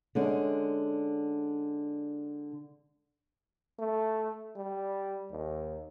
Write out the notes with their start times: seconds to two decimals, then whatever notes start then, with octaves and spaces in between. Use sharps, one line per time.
0.15 D3 G#3 C#4
3.79 A3
4.56 G3
5.32 D#2